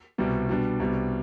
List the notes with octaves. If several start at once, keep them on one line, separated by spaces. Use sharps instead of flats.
C2 B2 G3
B2 G3 D4
C2 B2 G3